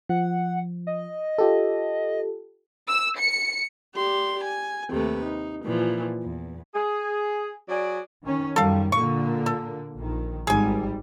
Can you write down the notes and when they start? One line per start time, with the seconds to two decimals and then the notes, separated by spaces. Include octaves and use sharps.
0.09 F3 F#5
0.87 D#5
1.38 F4 G4 A4
2.89 E6
3.18 C#7
3.95 G4 D5 C6
4.44 G#5
4.90 D#2 C3 A3 B4
5.23 D#4
5.63 A#2 E3 F3
6.22 E2
6.74 G#4
7.68 F#3 G#4 D5
8.22 D#3 C#4
8.56 F#2 D#3 G3 A4 F5
8.92 A#2 D3 A#3 C#6
9.46 A4
9.98 A#1 D#3
10.47 G#1 G#2 G3 G#4 G#5